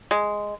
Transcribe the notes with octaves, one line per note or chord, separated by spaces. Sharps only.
G#3